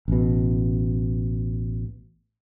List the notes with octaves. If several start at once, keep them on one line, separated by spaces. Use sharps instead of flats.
A1 B2